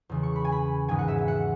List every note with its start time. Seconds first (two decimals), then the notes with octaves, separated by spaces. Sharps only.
0.09 E2 C#3 E3
0.23 C#6
0.36 B5
0.44 G#5
0.52 B5
0.88 G#1 G#2 E3 G#3 G#5
0.99 F#5
1.08 E5
1.18 E5
1.28 F#5